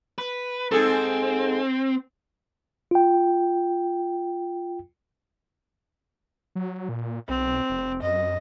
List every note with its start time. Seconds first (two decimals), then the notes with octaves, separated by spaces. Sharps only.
0.18 B4
0.71 G#2 C4 G#4 A4
2.91 F4 G5
6.55 F#3
6.89 A#2
7.29 B1 C4
7.70 F1
8.02 F#2 D#5